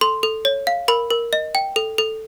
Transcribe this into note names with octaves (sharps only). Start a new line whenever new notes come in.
A4 C6
A4
C#5
F5
A#4 B5
A#4
D#5
G5
A4
A4